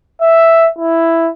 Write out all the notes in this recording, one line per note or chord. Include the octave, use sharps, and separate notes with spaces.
E5
E4